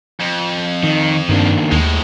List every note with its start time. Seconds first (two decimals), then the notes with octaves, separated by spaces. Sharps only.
0.20 F2
0.83 D#3
1.29 G2 D#3 A#3 D4
1.72 D#2 A2 G#3